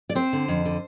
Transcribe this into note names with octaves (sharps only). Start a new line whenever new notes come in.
D5
C4 C5
D3
F2
D3